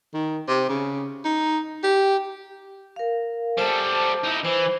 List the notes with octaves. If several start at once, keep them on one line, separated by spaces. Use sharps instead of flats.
D#3
C3
C#3
D#4
G4
A#4 F5
G3 A4 C5 A5
D#4 E4
E3 C5